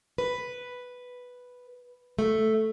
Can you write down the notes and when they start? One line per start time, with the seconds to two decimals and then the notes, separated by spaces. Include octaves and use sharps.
0.18 B4
2.19 A3